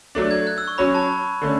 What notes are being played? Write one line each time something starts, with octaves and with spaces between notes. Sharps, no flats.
F#3 A3 D4
G#6
F#6
E6
C#6
F#3 C#4 F#4 C#5 B5
A5
D3 A3 C#4